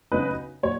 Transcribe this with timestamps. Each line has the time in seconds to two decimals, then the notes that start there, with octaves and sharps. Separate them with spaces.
0.11 C#3 F#3 B3 D#4 B4
0.63 A#2 F#3 C#5